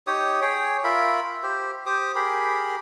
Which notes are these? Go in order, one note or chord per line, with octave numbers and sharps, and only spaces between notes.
D#4 G4 C#5 D#6
G#4 C#5 G5
F4 A#4 E5 B5
G4 C5
G4 C5 D6 D#6
G4 G#4 A#4 B5